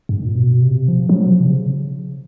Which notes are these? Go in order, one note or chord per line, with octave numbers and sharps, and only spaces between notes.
G2
A#2
B2
C3
F3
F#3
F3
C3
C#3